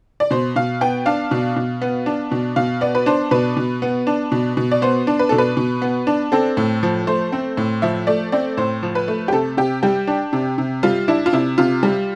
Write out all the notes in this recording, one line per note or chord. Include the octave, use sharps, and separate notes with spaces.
D5
B2 C5
B2 F5
B3 G5
D4 F5
B2
B2
B3
D4
B2
B2 F5
B3 D5
B4
D4 C5
B2 B4
B2
B3
D4
B2
B2
D5
B3 C5
D4
B4
B2 A4
B4
B2
B3
D4
C4 A4
A2
F3
A3 C5
C4
A2
F3 E5
A3 D5
C4 D5
A2 C5
F3
B4
A3
G4
C3 A4
C3 G4
G3 G4
D4
C3
C3
G3 F4
D4 E4
F4
C3 E4
C3 F4
G3